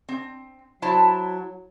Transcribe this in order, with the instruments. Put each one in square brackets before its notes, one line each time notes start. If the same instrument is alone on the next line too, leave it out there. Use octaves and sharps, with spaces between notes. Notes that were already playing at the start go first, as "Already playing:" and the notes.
[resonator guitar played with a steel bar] C4
[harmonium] F#3 [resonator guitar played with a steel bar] E4 C5 A5